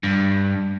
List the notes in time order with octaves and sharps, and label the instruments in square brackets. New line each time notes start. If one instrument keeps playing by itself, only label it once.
[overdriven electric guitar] G2